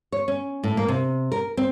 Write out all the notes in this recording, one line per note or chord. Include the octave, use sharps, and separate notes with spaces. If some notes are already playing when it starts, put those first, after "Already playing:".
C#5
C#4
A2
A#3
C3
A#4
C4